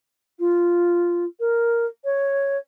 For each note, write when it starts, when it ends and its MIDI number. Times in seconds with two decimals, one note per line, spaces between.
0.39 1.25 65
1.40 1.86 70
2.05 2.58 73